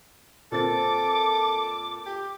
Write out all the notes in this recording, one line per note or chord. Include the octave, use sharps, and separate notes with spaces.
A#2 C4 A4 D6 A6
G4